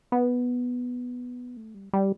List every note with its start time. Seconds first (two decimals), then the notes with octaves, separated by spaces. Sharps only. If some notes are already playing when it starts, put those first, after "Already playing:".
0.12 B3
1.57 A3
1.74 G3
1.93 G3